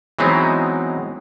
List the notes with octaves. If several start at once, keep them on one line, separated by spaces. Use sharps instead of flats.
E3 F#3 G#3 B3 C4 D#4